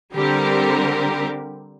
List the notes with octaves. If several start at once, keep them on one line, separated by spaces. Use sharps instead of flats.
D3 G3 C4 G4 A#4